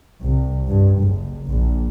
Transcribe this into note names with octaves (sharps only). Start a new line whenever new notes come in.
C2
G2
F#1
A#1